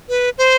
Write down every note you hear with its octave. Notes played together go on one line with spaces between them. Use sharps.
B4
C5